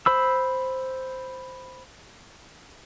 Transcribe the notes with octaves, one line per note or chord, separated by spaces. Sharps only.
C5 B5 E6